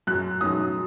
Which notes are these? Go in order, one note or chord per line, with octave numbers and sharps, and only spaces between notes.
F#2 F#6
D#3 F#3 D#6